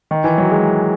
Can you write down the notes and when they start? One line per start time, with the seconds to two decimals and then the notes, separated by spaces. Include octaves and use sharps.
0.11 D#3
0.24 E3
0.38 F#3
0.51 G#3